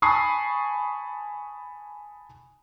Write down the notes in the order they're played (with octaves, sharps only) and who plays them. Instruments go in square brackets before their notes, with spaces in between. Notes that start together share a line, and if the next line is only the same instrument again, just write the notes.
[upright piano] G#5 A5 B5 C#6 D#6 C7